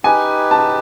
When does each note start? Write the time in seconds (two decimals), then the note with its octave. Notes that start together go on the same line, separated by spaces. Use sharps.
0.04 D#4 G4 B4 G#5
0.51 A5